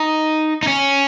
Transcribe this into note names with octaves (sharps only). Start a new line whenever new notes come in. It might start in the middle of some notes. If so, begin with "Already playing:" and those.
Already playing: D#4
D#4
C#4